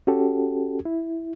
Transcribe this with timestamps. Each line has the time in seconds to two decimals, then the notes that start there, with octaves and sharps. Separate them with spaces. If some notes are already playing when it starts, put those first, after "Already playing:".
0.07 C#4 F#4 G4 A4
0.85 E4